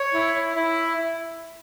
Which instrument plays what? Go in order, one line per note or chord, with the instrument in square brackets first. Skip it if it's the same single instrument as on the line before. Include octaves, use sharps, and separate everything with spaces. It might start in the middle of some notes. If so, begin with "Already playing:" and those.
Already playing: [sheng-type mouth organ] C#5
E4
E4